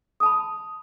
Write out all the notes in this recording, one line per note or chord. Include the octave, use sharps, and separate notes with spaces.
A5 B5 D#6